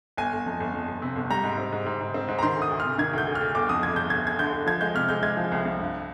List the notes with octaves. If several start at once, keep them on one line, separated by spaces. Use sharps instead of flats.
G1 G#5
G1
F2
G1
F2
G1
C3
G1
G3 A#5
G#2
C4
G#2
G#2
G#2
C4
G#2
A#5
D#3 C6
D2
D#6
D2
C3 F6
D#3 G#6
D2
G6
D2
F6
D2
G1 D6
F2 D#6
F2 G#6
G1 G6
G1 G#6
G1 G#6
D3 G6
D3
F3 G#6
G#3 G6
C3 F6
G#3 G6
G#3 G#6
F3
C2
C2
G2